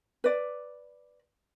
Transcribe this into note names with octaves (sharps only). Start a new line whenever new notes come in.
B4 D5